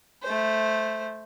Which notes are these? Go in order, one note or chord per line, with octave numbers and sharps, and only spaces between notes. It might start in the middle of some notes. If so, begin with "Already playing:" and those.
A3 C5